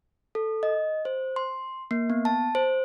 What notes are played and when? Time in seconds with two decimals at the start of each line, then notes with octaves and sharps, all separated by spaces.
0.35 A4
0.63 D#5
1.05 C5
1.36 C6
1.91 A#3
2.10 B3
2.25 A5
2.55 C5